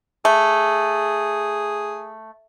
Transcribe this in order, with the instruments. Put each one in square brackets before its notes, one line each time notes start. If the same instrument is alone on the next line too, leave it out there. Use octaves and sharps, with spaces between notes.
[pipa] A3 [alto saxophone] G#4